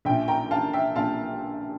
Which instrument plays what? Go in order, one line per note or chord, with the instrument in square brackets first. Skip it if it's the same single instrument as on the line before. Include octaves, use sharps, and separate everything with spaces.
[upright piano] A#1 A#2 E5 G5
G5 A#5
F5 A5
E5 G5
A#1 A#2 F5 A5